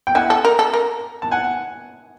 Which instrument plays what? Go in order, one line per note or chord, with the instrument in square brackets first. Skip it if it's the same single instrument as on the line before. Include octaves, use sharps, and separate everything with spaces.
[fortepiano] G5
[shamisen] E4 [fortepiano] F#5 G#5
[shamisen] A4
A#4
A4
A#4
[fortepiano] A5
F#5 G#5